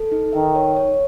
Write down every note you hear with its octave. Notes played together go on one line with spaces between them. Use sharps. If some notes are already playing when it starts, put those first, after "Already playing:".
Already playing: A4
D#4
D#3 E5
C#5
C#5